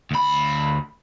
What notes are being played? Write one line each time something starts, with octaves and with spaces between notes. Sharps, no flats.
D2 B5